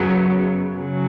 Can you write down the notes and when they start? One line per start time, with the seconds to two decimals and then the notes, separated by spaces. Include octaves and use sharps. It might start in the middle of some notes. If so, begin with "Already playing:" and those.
Already playing: F#2 C#3 F#3 B3
0.77 C#3 F#3